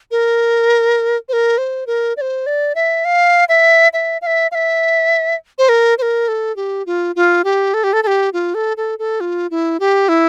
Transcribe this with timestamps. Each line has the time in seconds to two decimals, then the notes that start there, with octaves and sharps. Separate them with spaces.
0.11 A#4
1.29 C5
1.33 A#4
1.58 C5
1.87 A#4
2.17 D5
2.21 C5
2.46 D5
2.75 E5
3.05 F5
3.49 E5
3.93 E5
4.22 F5
4.27 E5
4.51 F5
4.55 E5
5.58 C5
5.69 A#4
5.98 C5
6.02 A#4
6.28 A4
6.56 G4
6.86 F4
7.16 F4
7.44 G4
7.74 A4
7.84 G4
7.93 A4
8.03 A4
8.07 G4
8.33 F4
8.55 A4
8.77 A4
8.99 A4
9.20 F4
9.51 E4
9.80 G4
10.09 E4